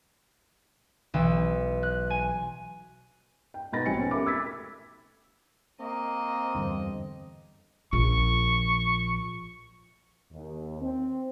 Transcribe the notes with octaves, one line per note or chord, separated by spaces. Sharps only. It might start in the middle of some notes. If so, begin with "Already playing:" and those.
B1 E3 E6
F#6
G#5
G5
B2 B3 D#4 B5 A6 A#6
A#1 C4 F#4 C#5 G#5 C#7
B2 C#4 G5
A3 G4 A#4 E5 B5 D6
D6 E6 G#6 A6 B6
A#3 C4 D#5
E2 G2 D3
A#1 C#6
D#2
C4